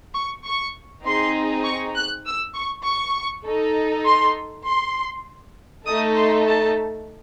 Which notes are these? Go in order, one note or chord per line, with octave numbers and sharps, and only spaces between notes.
C#6
C#6
C4 D#4 G#4 C6
C#6
F#6
E6
C#6
C#6
D#4 A4
C6
C6
A3 D#4 A4 D#6
C6
A5